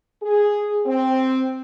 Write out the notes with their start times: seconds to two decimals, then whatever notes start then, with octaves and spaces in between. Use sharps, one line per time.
0.22 G#4
0.86 C4